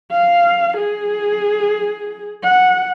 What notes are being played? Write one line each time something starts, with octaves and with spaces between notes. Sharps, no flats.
F5
G#4
F#5